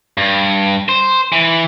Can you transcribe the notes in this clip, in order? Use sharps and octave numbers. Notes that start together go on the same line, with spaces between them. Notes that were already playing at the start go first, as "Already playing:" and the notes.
G2
C5
E3